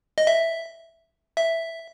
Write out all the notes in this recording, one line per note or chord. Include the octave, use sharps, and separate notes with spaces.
D#5
E5
E5